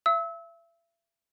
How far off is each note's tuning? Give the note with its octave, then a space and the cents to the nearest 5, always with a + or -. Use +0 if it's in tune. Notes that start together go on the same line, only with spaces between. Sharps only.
E5 +35 E6 -30